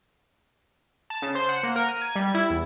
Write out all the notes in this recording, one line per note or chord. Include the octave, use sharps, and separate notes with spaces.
A5
C#3
C5
F#5
A#3
A#4
D#7
G#6
G3
E4
E2